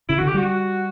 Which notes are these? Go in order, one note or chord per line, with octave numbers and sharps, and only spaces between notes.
C#3 E4
D3 F#4
G4
G3 F#4